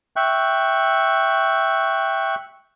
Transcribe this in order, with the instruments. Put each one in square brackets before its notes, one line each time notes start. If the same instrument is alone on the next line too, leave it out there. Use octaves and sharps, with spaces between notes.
[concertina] E5 G5 C#6 F#6